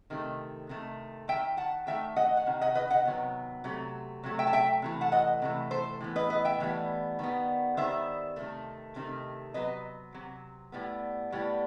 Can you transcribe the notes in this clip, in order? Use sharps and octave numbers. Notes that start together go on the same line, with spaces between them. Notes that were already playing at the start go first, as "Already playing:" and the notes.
C3 D#3 A3
C3 D#3 A3
D#3 A3 E5 G5
F#5 A5
D#3 A3 E5 G5
D#5 F#5
F#5
C3 D#3
D#5 F#5
B4 D#5
D#5 F#5
C3 D#3 F#3 B3
C3 F#3 A3
C3 F#3 A3
E5 G5
A5
E5 G5
C3 E3 A3
F#5 A5
D#5 F#5
C3 E3 A3
A4 C5
A2 E3 B3
B4 D#5
B4 D#5
E5 G5
A2 E3 G3 B3
D#3 G3 B3
D#3 G3 B3 C5 E5
C3 D#3 A3
C3 D#3 A3
C3 F#3 B3 B4 D#5
C3 F#3
A2 G3 B3
A2 G3 B3